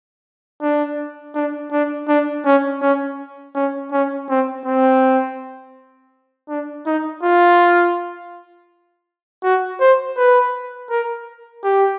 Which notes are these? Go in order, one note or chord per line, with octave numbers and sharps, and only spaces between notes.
D4
D4
D4
D4
C#4
C#4
C#4
C#4
C4
C4
D4
D#4
F4
F#4
C5
B4
A#4
G4